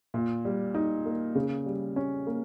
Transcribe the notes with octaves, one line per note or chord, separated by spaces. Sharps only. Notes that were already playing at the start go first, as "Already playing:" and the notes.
A#2
G3
D#4
A#3
C#3
G3
C#4
A#3